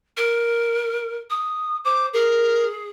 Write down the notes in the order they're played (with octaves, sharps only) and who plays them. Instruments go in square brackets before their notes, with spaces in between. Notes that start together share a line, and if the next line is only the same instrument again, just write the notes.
[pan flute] A#4
D#6
[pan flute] C5 [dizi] D6
[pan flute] G#4 [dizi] A#4